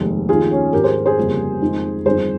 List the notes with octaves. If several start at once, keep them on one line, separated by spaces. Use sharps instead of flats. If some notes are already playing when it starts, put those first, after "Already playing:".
Already playing: F1 D#2 D#3 G#3
F1 D#2 D#3 F4 G#4
C#4
G#1 G#2 F3 G4 A#4
G#4 C5
G#4 C5
G1 F2 C#3 G3 A#3
F2 D#3 G#3
G1 F2 D#3 G#4 C5